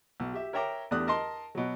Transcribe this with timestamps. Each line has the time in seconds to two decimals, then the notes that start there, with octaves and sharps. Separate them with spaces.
0.20 B1
0.33 G4 E5
0.53 A#4 C#5 E5 G5 A#5 D6
0.91 E2 A3 D4 G4 D#6 F#6
1.07 A#4 D#5 A5 C6
1.55 B2 F#3